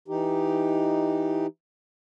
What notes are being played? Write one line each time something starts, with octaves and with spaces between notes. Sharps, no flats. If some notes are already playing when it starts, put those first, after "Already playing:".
E3 D#4 G4